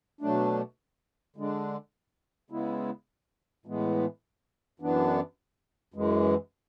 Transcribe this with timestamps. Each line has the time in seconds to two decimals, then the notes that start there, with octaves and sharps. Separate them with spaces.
0.21 B2 F#3 A3 D4
1.36 D3 G#3 D4
2.50 C#3 G#3 B3 E4
3.66 A2 E3 G#3 B3
4.80 F#2 E3 B3 D4
5.94 F#2 E3 G#3